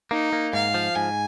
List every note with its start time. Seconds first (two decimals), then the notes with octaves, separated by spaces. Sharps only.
0.11 A#3 D#4
0.33 A#3
0.53 G#2 F5
0.74 F3
0.95 G#2 G#5